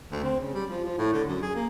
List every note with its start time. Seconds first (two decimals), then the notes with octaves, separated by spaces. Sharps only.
0.11 D2
0.23 C4
0.40 C#3
0.53 G3
0.70 F3
0.84 F3
0.98 A2
1.13 D3
1.28 F#2
1.42 G#4
1.55 A#3